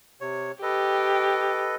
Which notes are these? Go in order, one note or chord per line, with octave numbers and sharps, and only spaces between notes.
C3 C#5
G4 A4 B4 D#5